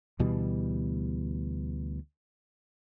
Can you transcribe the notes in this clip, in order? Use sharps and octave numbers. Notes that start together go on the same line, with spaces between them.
D2 B2 E3 G3